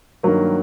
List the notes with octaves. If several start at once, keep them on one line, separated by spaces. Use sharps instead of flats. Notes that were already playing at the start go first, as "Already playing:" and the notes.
G2 D#3 F#3 A#3